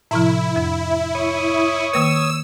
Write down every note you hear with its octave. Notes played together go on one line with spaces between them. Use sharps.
A2 C3 F3 E4
F2
C#5 C#6 D#6
D#3 A#3 B4 E6